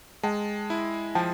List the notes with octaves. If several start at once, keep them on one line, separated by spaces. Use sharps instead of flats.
G#3 G5 A5
E4
F3 G5 A5